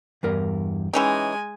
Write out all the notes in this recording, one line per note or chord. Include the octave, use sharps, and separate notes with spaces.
E2 G2 A#4
E3 G#3 C#4 D#4 G5 G#5